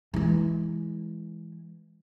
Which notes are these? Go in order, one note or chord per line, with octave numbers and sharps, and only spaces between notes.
E3 G#3